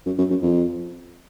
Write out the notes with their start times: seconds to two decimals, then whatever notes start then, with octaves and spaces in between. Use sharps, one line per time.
0.06 F#2
0.18 F#2
0.30 F#2
0.42 F2